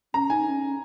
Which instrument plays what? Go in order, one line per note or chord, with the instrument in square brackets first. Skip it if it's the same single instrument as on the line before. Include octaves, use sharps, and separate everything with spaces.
[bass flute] C#4 [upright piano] A#5
[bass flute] D#4 [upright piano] G#5
[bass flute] C#4